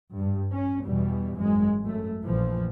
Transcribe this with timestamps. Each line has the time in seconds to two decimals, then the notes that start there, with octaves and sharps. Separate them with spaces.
0.14 G2
0.54 C#4
0.84 E2 B2 E3 G3
1.37 G#1 F#2 G#3
1.82 F#2 A3
2.23 A#1 E3 F3